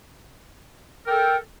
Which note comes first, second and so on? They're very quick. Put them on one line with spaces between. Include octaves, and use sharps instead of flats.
A#4 G5 A4